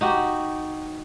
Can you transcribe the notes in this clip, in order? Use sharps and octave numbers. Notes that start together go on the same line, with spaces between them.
D#4 F#4 G4